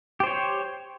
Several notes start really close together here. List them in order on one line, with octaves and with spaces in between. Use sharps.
G4 C5 C#5